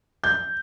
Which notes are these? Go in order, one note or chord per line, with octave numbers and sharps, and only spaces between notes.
G6